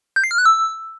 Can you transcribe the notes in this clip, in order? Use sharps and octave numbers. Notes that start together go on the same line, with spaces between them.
G6
C7
F6
F#6
E6